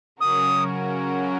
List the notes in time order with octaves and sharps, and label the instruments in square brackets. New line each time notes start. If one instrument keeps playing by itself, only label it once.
[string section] C#3 F#3 C#4 F#4 A#4 [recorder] D#6